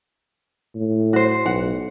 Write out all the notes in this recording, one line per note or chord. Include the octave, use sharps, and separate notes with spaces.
A2
F#4 C5
B1 F#5